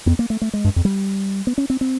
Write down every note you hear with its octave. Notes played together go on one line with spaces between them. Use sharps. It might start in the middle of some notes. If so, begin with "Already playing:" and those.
F2 B3
A#3
A3
A3
G#3
G2
F2
G3
B3
C#4
C4
C4